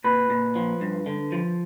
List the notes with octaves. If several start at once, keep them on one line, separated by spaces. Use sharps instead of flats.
A#2 B4
A#2
F3
G2
D3
F3